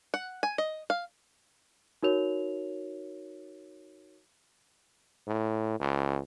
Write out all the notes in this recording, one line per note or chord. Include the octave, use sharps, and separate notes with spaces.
F#5
G#5
D#5
F5
D#4 F#4 A#4 C#5 F7
A2
C#2